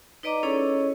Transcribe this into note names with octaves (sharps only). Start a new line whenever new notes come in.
D#4 B4 D5 D#5 A#5 D6
C#4 E4 G#4 A4 C#5 D#5